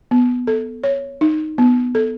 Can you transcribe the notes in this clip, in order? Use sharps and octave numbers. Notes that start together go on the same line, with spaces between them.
B3
A4
C#5
D#4
B3
A4